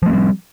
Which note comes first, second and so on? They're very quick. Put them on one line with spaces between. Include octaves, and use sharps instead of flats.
F3 A3 C4 G3